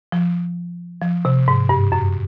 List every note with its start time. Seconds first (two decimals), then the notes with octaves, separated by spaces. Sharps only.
0.12 F3
1.02 F3
1.25 C3
1.48 G#2
1.69 G2
1.92 F#2